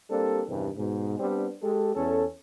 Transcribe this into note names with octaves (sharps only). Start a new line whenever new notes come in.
G3 A#3 C4 D4 G4 A4
E2 G2 C3 D#3 E3
G#2 B2
G3 B3 C4 D4
G#3 G4 A4
E2 C#4 A4